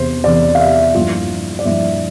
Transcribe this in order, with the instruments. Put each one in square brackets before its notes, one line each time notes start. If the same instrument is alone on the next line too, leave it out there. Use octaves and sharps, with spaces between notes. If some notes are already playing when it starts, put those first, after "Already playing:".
Already playing: [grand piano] E2 C3 E3 C5
E2 C3 E3 D5
F5
E5
G2 F3 A#3 E4 F4
D5
G2 F3 A#3 E4 E5